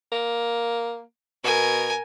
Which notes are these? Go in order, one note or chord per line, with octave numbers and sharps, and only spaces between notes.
A#3
B2 A#4 G#5